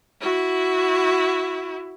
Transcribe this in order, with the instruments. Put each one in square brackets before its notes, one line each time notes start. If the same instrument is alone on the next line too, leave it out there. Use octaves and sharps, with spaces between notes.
[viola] E4 F#4